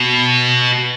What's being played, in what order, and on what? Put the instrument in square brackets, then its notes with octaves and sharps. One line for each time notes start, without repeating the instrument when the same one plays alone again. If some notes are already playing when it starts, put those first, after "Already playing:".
Already playing: [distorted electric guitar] B2